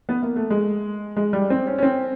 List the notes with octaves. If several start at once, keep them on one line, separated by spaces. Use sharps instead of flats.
B3
A#3
A3
G#3
G#3
G3
C4
C#4
C#4
C4